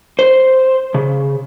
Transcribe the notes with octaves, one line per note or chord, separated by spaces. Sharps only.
C5
C#3